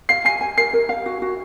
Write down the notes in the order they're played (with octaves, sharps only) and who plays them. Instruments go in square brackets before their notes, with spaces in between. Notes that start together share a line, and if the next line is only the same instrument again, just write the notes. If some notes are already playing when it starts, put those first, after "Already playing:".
[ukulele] F5 [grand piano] C7
[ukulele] G#5 [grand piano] C7
[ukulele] G#5
[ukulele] A#4 [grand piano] C7
[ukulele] A#4
F5
F#4
F#4